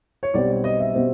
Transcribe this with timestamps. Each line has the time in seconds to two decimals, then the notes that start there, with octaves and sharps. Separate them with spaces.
0.23 C#5
0.34 B1 B2 G3 C4 D5
0.64 D#5
0.79 E5
0.94 B2 G3 C4